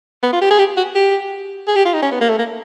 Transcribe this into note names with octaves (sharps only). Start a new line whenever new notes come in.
B3
F4
G4
G#4
G4
F#4
G4
G#4
G4
F4
D#4
C#4
B3
A#3
A3
A#3